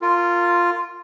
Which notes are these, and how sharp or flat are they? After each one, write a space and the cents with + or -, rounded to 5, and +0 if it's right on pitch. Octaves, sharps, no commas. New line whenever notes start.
F4 +0 A#4 -25